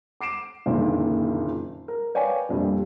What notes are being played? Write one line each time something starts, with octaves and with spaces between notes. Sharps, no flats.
D6 C7 D7 E7
F#1 F2 A#2 D3 D#3
A#4
B4 C#5 D5 F5 G5 G#5
A#1 F2 A#2 G3